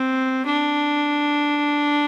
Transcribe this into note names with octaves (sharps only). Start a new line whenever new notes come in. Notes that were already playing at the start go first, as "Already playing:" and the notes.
Already playing: C4
D4